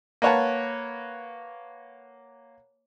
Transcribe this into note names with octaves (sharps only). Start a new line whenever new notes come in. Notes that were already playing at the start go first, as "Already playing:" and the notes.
A#3 B4 C#5 F#5 A5